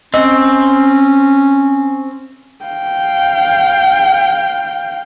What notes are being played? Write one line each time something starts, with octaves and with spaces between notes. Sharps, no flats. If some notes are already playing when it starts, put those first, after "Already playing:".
C4 C#4 D#5
F5 G5